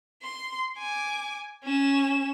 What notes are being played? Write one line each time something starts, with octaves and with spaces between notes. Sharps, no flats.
C6
G#5 D6
C#4 E7